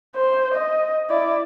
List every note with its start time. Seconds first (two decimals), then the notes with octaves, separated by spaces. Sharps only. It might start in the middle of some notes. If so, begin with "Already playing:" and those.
0.16 C5
0.54 D#5
1.10 E4 D5